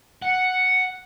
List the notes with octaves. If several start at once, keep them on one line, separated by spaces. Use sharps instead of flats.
F#5